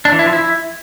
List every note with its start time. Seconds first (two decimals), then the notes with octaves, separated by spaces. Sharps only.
0.05 D4
0.12 E3
0.19 E4
0.26 F3
0.33 E4